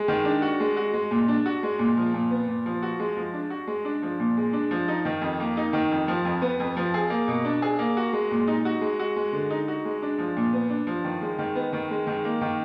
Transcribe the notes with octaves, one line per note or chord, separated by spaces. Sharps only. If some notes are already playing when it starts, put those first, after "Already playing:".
Already playing: G#3
D#3
D4
F#4
G#3
F#4
G#3
A#2
D4
F#4
G#3
A#2
F3
A#2
B3
A#2
F3
F#4
G#3
F3
D4
F#4
G#3
D4
F3
A#2
G#3
D4
F3
D#4
D#3
F2
A#3
D#4
D#3
F2
F3
F2
B3
F2
F3
G#4
A#3
B2
D4
G#4
A#3
F#4
G#3
A#2
D#4
F#4
G#3
F#4
G#3
D3
D#4
F#4
G#3
D4
F3
A#2
B3
D4
F3
D#3
G#3
D#3
B3
D#3
G#3
D#3
A#3
D#3